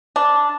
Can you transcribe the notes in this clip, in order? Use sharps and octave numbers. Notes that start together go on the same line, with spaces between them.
D4